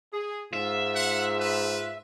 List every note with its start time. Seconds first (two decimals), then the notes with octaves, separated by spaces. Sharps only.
0.13 G#4
0.53 G#2 F4 E5
0.95 F#5
1.40 B4